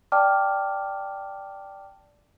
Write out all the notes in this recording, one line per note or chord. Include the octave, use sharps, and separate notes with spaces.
D5 G5 A5 D6 F6